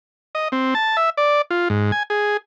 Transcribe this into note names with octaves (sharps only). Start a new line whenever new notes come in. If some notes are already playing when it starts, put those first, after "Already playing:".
D#5
C4
A5
E5
D5
F4
G#2
G#5
G#4